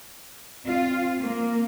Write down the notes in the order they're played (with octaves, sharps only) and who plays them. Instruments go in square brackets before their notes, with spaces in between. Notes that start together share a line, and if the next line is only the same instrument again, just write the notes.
[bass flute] C4 [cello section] F4
[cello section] A#3